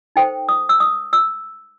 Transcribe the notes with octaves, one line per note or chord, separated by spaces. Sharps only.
D#4 A4 C5 G5
D#6
E6
D#6
E6